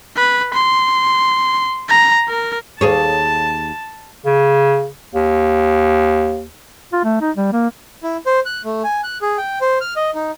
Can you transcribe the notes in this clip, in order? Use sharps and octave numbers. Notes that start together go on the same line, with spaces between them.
B4
C6
A#5
A#4
D#2 G#4 C#5 A5
C#3
D#2
F4
A3
D#4
G3
A#3
E4
C5
F#6
A3
G#5
F#6
G#4
G5
C5
F6
D#5
D#4